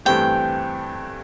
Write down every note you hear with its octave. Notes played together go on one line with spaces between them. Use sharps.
G2 E3 A3 C4 G4 G5